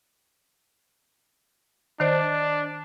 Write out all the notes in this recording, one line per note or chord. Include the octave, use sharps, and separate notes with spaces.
D#3 D4 C5 D5